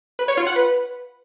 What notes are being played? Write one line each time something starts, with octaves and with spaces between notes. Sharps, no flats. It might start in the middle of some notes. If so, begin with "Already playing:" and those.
B4
C#5
F4
F#5
B4